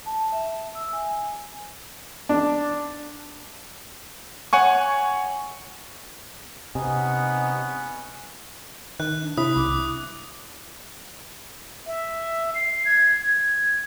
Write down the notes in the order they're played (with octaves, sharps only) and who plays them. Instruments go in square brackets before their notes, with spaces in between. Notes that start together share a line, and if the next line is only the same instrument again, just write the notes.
[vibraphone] A5
E5
E6
G#5
[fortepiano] D4
[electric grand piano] C#5 F#5 G#5 C#6
[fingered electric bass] C3 [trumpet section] B3 C#4 F#5 [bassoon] D#4 [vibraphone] G#5
[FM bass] D#3 [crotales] F#6
[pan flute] D4
[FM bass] C3 [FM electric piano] E4 B5 [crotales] D#6
[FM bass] C2 [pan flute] D6
[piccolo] E5
C7
G#6
G#6